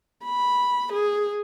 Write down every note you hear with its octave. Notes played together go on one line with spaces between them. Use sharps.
B5
G#4